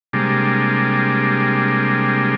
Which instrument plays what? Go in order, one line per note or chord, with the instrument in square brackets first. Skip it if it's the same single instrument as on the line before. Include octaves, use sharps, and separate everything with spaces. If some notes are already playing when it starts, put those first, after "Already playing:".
[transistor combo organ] C3 G3 G#3 A#3 D4